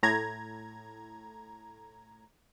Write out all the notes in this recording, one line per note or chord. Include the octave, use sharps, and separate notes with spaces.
A2 A#5 G#6